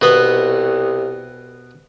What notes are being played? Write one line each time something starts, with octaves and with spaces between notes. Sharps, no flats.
C2 B2 B3